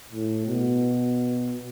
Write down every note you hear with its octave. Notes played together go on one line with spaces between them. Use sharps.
A2
B2